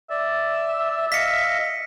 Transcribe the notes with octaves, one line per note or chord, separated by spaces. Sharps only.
D5 E5
D#5 F5 B6 C#7